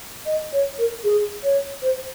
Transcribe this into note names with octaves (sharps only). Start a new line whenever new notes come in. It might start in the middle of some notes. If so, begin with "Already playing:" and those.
D#5
C#5
A#4
G#4
C#5
C5